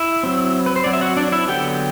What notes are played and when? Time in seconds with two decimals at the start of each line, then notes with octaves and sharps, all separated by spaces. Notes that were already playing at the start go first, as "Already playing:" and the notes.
Already playing: E4 E5
0.23 F#3 C4
0.66 B4
0.76 C5
0.84 F#3 C4 D5
0.93 E5
1.01 F#4 F#5
1.17 D4 D5
1.32 E4 E5
1.48 D3 F#3 B3 G4 G5